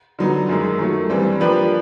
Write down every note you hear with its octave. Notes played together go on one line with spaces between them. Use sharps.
D3 F#3 B3 D#4
F#2 D#3 G#3
D#3 F#3 A3
G2 E3 G3 C4
F3 A#3 D4 G4 B4